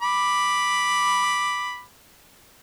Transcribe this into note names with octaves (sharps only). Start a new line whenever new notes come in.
B5 D6